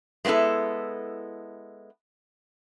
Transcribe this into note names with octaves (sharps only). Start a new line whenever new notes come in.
G#3 A3 B3 E4 A4